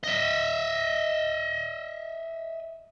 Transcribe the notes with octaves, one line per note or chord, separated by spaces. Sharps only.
D#5 E5